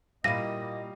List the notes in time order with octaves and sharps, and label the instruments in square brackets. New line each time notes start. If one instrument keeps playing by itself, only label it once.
[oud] A#2 E4 [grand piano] G3 F5 D#7 [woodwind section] A#3 D#5 [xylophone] A#6